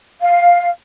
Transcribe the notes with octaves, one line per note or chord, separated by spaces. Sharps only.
F5